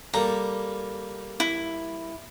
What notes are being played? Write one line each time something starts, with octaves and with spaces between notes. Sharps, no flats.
G3 A#3 A4 A#5
E4